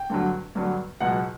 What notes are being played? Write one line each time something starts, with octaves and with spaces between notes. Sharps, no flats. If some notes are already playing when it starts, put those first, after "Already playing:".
Already playing: G5
G2 D3 F#3
G2 D3 F#3
C#2 B2 F#3 F#5